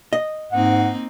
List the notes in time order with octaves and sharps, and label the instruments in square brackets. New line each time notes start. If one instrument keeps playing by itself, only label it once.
[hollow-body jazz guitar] D#5
[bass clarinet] G#2 [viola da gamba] A#3 C4 D#4 [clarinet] F#5